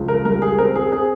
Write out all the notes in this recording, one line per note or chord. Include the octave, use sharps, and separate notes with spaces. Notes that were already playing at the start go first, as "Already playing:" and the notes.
Already playing: C#2 F3
A#4
G3 A#4
G#4
C4 A#4
G#4
C4 G#4